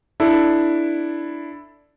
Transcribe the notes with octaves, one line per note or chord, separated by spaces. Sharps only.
D4 E4 A4